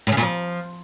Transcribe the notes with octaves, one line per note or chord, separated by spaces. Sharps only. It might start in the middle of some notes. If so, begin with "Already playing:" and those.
A2
C#3
A#2
F3